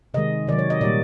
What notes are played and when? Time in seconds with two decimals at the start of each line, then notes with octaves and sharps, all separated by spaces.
0.14 C3 D#3 G#3 D#5
0.47 C3 D#3 F#3 D5
0.59 C#5
0.70 D#5
0.81 A#2 G3 A#3 D5